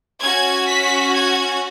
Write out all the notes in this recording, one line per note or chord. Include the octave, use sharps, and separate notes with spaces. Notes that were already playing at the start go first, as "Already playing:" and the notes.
C#4 F#4 G#6
B6
G#6